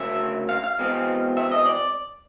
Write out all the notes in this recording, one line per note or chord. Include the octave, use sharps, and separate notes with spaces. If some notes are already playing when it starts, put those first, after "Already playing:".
Already playing: D2 C#3 F#3 A#3 E5
F5
F5
E2 B2 G#3 C4
E5
D#5
D5